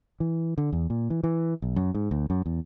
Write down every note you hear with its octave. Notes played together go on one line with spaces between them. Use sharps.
E3
D3
E2
A#2
E3
E3
B1
F#2
G#2
D2
F#2
E2